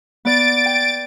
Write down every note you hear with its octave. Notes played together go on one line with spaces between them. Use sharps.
B3 D5 A6 D7
G5